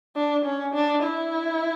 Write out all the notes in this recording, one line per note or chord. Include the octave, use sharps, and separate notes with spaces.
D4
C#4
D4
E4